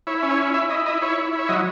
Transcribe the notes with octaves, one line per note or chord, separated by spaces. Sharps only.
E4 C#5
C#4
C#5
E4
E4 E5
E4 D#5
E4 D#5
E4 C#5
E4
E4
C#5
F#3 D#5